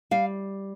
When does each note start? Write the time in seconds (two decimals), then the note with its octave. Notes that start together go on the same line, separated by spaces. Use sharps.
0.11 G3 F5